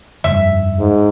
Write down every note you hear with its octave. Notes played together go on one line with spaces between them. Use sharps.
F1 G2 E5
G#2